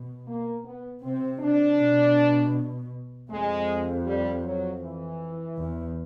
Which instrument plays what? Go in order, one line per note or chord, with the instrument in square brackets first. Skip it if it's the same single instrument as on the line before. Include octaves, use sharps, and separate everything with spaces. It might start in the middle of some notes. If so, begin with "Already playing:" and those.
Already playing: [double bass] B2
[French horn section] A#3
B3
[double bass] C3 [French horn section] C4
[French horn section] D4
[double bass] B2
[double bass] F2 [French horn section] G#3
[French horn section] G3
F#3
E3
[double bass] E2